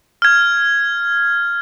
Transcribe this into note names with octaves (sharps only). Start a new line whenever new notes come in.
F6 G#6